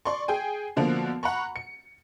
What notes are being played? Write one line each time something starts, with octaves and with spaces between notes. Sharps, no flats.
D5 C6 C#6
G#4 G5 G#5
B2 D3 F3 A#3
F#5 A#5 B5 C#6
C#7